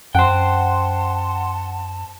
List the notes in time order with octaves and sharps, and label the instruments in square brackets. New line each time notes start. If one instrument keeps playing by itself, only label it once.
[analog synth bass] F#2 [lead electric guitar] C5 G5 [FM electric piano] F#5 C6 [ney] A5